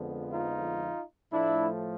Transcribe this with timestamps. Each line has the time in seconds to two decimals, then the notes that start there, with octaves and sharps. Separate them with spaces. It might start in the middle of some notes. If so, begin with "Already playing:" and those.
Already playing: F2 D3 F3 G#3 B3
0.32 D#4 F4
1.31 A2 F3 A3 D4 E4